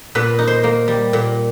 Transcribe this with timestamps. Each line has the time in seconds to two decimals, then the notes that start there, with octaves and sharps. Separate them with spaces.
0.15 A#2 B4
0.39 D#4
0.47 C5
0.64 A#3
0.88 G3
1.13 A#2